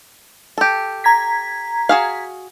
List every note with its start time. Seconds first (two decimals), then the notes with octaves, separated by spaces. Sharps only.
0.58 G4 A4
1.04 A#5 G#6 B6
1.89 F#4 G#4 F5